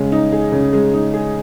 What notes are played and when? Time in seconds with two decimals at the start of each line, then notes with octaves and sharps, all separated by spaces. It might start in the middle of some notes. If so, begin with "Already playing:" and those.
Already playing: C#3 G#3
0.12 D#4
0.32 G#4
0.52 C#3
0.73 G#3
0.94 D#4
1.14 G#4